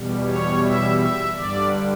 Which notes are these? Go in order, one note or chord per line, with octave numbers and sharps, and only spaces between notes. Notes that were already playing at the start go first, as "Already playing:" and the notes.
Already playing: E2 B2 G3
C#5
E5
E5
G2 D3 G3 D5